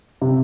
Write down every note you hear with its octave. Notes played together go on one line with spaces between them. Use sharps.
C3